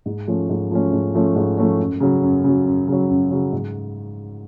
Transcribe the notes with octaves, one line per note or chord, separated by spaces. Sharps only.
G#2
F3 A3 C#4
G#2
F3 A3 C#4
G#2
F3 A3 C#4
G#2
F3 A3 C#4
F#2
C#3 F#3
F#2
C#3 F#3
F#2
C#3 F#3
F#2
C#3 F#3
G#2